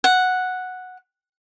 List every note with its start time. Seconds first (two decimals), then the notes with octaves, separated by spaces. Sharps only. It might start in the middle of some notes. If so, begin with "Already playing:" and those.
0.04 F#5